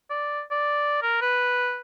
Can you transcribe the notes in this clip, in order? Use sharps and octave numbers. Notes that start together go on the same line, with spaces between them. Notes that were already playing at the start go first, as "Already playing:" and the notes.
D5
D5
A#4
B4